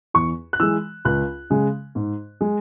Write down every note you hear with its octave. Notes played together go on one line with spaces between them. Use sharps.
E2 C#6
F#6
E3 G#3 E6
C#2 F#6
C#3 G#3
G#2
G#3